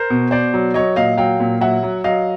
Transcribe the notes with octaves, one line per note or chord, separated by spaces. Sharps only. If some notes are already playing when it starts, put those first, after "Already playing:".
Already playing: A#4 C5
B2
B2 C5 D5
F#3
F#3 C#5 D#5
A#2 D#5 F5
F#3 F5 G5
A#2
F#3 E5 F#5
F#3
F#3 D#5 F5